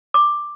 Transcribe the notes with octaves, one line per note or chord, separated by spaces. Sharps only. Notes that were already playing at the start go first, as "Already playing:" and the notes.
D6